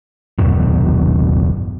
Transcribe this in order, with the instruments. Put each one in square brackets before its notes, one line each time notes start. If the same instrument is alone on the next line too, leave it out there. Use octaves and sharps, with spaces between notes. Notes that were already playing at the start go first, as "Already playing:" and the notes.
[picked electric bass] D#1 F#2 B2